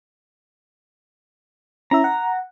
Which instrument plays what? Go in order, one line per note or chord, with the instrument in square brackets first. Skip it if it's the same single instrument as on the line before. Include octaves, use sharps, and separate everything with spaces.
[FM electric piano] C#4 E4 E5 [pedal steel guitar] A#5
[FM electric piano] F#5